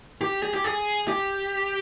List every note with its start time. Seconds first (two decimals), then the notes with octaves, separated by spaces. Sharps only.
0.21 G4
0.43 G#4
0.54 G4
0.64 G#4
1.08 G4